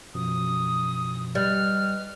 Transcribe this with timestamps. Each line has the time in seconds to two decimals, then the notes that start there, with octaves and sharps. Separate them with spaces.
0.15 F#2 B2 F3 D#6
1.35 G3 B4 D#5 F6 F#6